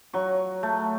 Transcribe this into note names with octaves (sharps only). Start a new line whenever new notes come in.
F#3 C#6
A3